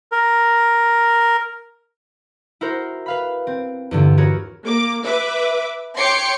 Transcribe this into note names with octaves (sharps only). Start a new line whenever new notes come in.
A#4
E4 F#4 A#4 C5
B4 F5 B5
C4
E2 G2 D3
E4 F#4 G#4 A#4 C#5
A#3 D6
B4 E5 D6
C#5 G5 C6 D6 C7 C#7